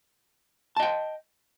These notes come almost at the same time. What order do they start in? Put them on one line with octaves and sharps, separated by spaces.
A5 D#5 G5